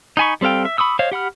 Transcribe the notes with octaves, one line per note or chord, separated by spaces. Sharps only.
D#4 F#4 G#5 B5 C#6
G3 C4 A4 F5 G5
E5
B5 C#6 D#6 E6
C5 C#5 D#5 F5
G4 F#5 B5 F6